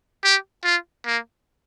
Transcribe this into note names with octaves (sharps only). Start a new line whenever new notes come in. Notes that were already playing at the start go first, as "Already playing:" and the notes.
G4
F4
A#3